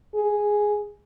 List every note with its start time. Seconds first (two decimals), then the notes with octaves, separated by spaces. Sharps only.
0.15 G#4